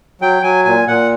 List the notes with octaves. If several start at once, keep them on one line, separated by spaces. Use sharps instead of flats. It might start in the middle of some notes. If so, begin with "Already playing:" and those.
F#3 G5
F#3 G#5
A#2 G#5
A#2 F#5